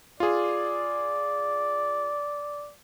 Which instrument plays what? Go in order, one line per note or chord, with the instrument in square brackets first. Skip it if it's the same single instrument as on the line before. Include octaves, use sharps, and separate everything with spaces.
[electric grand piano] F4 G#4 [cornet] D5